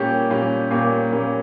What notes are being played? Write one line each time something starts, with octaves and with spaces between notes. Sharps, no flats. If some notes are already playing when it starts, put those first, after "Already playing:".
Already playing: A#2 G3 A#3 C#4 G4
A#2 G3 A#3 C#4
A#2 G3 A#3 C#4
A#2 G3 A#3 C#4